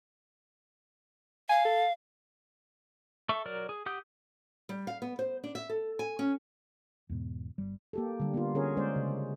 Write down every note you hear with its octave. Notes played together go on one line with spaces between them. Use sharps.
F5 G#5
A4
A4 E5 C#6
F#3 A#4 D5
G#4
G4 F#5 D#6 G6
G3
F5
B3
C5
D4
E5
A4
G#5
C#4
E2 G#2 B2
G1 G3
A#3 G4 A4
D3 G3
A#3 B3 F4
D3 C#4 G#4 A#4 C#5
G#3 C#4 C5 D5
C#3